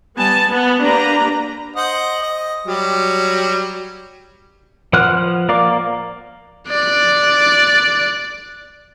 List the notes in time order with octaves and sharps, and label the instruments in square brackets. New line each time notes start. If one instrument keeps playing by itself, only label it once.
[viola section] G3 B3 G#5 A5
B3
A#3 D4 G4 B4 A#5
[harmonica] C5 D#5 F#5
D#5
F#3 G3
[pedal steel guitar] F3 B4 F#5 F6 F#6
A#3 D5 F5 D6
[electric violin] D5 F#6